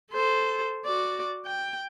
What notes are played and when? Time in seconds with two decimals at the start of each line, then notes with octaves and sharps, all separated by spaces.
0.12 A4 C5
0.85 F#4 D5
1.46 G5